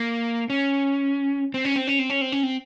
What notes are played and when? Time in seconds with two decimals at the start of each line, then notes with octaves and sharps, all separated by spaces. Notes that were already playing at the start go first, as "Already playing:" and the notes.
Already playing: A#3
0.50 C#4
1.54 C4
1.65 C#4
1.76 C4
1.87 C#4
1.99 C4
2.10 C#4
2.21 C4
2.32 C#4
2.43 C4